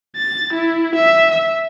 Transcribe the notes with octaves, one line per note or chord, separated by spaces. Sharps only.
A6
E4
E5
E5